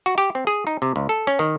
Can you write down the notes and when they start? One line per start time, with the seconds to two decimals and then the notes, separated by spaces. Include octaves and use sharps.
0.06 F#4
0.18 G4
0.35 C4
0.47 G#4
0.67 D#4
0.82 C3
0.96 C#2
1.09 A4
1.27 C#4
1.39 D#3